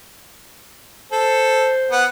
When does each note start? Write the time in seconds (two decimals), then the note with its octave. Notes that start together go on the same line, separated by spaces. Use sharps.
1.12 A4 C5
1.91 B3 F#5